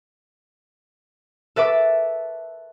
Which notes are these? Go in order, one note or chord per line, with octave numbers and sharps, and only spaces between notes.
A4 B4 E5 D6